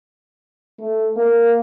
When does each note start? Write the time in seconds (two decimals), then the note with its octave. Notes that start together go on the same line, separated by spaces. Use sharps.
0.80 A3
1.17 A#3